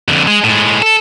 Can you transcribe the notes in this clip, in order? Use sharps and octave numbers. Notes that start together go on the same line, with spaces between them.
F2 D3
G#3
A2 G#3
A4